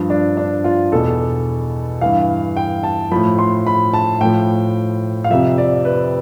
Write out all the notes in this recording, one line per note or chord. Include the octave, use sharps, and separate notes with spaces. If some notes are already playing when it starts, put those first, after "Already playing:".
Already playing: G2 F3
D4
D4
F4
E2 B2 A4
G2 E3 F5
G5
A5
A2 F3 B5
C6
B5
A5
A2 F3 G5
F5
F2 C3 F3 E5
D5
B4